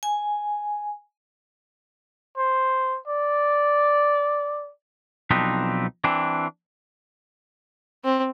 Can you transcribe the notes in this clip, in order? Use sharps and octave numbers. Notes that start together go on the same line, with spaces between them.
G#5
C5
D5
B1 F3 C4 D4 D#4 B4
E3 C4 D4
C4